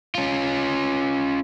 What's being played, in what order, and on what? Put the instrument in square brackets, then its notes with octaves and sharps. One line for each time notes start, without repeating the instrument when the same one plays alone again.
[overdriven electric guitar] C#4 F4